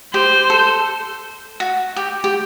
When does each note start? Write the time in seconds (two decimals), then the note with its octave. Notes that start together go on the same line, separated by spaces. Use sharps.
0.14 G4 C5
0.50 A4
1.60 F#4
1.96 G4
2.24 G4